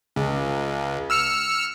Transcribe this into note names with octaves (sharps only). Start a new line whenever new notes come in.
C#2
E6 F6 C#7